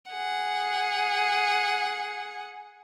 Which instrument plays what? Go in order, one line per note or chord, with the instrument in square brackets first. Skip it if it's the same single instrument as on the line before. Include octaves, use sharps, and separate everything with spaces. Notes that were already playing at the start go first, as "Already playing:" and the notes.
[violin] G#4 F#5